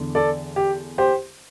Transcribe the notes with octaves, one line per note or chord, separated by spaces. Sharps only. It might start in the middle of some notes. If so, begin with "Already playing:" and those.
Already playing: E2 D3
A4 D5
G4
G4 C5